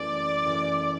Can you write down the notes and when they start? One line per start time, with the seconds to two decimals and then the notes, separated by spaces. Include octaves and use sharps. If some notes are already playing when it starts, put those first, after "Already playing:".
Already playing: F#2 E3 A3 D5
0.45 F#2 E3 A3